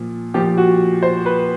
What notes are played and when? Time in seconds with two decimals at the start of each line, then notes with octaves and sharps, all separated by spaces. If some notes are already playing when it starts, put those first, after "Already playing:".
Already playing: A#2 F3
0.34 A#2 F3 G4
0.58 F#4
1.03 C5
1.26 B4